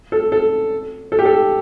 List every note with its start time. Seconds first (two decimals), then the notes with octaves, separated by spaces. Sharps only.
0.12 A4
0.32 A4
1.12 A4
1.19 G4
1.25 A4